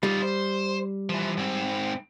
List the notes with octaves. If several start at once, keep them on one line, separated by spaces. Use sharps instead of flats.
G3 D#4 F4
C5
E3 F3
G#2 C4